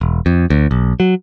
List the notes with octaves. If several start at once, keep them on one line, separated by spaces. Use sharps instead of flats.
E1
F2
D2
B1
F#3